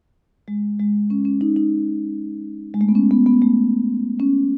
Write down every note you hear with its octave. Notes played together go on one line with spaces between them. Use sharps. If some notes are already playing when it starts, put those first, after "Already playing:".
G#3
G#3
C#4
C#4
D#4
D#4
G#3
A3
B3
C#4
B3
B3
A3
C#4